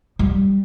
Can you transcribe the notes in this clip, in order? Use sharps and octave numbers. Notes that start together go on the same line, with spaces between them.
G3